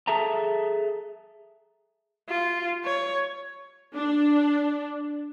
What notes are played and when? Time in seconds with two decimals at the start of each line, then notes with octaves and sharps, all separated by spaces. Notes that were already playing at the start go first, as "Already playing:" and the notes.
0.07 G#4 A4 E5 A5 A#5
2.29 F4
2.84 C#5
3.95 D4